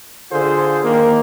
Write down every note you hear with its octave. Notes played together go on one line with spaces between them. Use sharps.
D3 F4 G#4 A4 C5
D#3 A#3